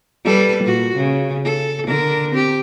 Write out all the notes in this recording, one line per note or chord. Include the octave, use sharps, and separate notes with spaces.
G3 A4 B4
A#2 F#4
C#3
A4
D3 D4 A#4
C4 G4